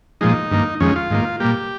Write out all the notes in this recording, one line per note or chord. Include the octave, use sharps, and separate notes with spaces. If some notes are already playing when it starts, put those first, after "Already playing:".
A#2 F3 G#3 D#4
G2 D#3 A#3
F2 D#3 G#3 C#4
F4
G#2 D#3 A#3
A#2 G3 A#3 G4